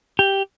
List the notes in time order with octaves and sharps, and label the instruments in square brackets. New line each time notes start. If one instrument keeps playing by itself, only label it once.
[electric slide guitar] G4